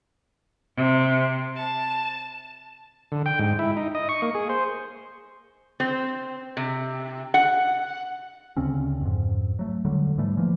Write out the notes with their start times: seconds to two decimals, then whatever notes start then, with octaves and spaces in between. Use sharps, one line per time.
0.75 C3
1.56 A5
3.12 D3
3.26 G5
3.39 G#2
3.59 E4
3.77 D#4
3.95 D#5
4.09 C#6
4.22 A#3
4.35 G#4
4.49 C5
5.80 C4
6.57 C3
7.34 F#5
8.57 D2 C#3 C4 C#4
9.01 F2 G#2
9.59 F#3 A3
9.85 E1 D3 F#3 G3
10.18 G#2 E3 G3 A3
10.37 E3 F3 A3 A#3